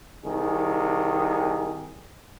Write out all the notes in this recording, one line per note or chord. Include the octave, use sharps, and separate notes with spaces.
C2 D#3 G#4